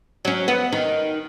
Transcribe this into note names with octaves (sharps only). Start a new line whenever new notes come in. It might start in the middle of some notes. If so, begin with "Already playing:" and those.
F#3 C#4
B3
D#3